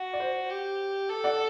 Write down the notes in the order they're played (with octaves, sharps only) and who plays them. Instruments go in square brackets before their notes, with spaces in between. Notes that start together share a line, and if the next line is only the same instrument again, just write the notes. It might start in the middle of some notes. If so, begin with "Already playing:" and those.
Already playing: [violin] F#4
[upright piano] D5
C5
[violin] G4
A4
[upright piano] D5 F#5